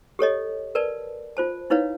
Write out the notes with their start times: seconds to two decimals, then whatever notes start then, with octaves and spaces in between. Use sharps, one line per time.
0.19 G4 A4 C#5 D#5
0.75 A#4 B4 D5 A5
1.37 F4 C5 A5
1.70 D#4 E4 B4 C#5 F5